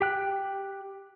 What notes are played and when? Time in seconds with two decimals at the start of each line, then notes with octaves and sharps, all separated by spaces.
0.01 G4 G5 F#6